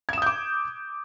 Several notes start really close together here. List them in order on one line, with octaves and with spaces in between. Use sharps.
G#6 E7 D#6 G6 D6